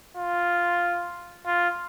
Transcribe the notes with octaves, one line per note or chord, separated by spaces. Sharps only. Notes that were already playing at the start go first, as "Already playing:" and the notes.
F4
F4